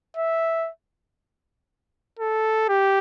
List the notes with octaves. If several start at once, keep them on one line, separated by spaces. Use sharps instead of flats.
E5
A4
G4